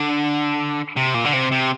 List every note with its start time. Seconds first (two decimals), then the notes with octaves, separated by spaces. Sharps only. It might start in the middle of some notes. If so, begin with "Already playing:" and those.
Already playing: D3
0.96 C3
1.14 A#2
1.25 D3
1.33 C3
1.51 C3